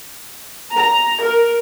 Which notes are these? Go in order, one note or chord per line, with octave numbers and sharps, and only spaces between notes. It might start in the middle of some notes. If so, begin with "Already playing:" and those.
A#5
A#4